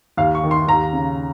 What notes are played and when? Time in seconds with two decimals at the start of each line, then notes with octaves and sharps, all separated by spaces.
0.17 D#2 F5
0.35 C#6
0.44 D#3
0.51 C6
0.68 D#2 A#5
0.93 C#3